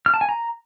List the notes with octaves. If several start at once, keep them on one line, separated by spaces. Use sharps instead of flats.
F6
A5
G#5
A#5